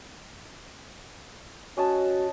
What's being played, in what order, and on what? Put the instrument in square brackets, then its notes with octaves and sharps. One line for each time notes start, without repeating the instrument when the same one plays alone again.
[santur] C#4 D#5 A5 [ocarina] F#4